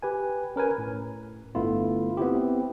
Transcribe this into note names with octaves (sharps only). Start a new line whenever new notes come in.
G4 B4 G#5
C#4 A#4 B4 G#5
A2
G1 D3 A3 B3 E4 F4
B3 C4 E4 G4